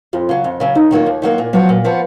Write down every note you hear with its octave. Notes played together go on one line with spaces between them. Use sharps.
F2 F4
C#3 F#3
F2
C#3 F#3
D#2 D#4
D#3 F#3 A#3 F4
D#2
D#3 F#3 A#3 F4
A#2
F3 F#3 B3 F#4
A#2
F3 B3 F#4